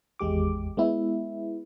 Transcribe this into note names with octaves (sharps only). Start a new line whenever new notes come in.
G#1 E2 G#3 G4 D6
G#3 B3 E4